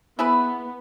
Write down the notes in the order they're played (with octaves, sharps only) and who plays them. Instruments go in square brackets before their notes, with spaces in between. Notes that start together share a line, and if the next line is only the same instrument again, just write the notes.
[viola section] B3 [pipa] E4 G#4 B4